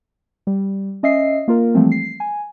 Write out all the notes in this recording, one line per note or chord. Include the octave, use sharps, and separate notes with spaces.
G3
C#4 D#5 E5 C7
A#3 F4 A#4
E3 F3 G3 A3 C4
C7
G#5